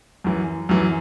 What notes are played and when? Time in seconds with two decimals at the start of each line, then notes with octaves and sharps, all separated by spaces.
0.24 F#2 E3
0.69 F#2 E3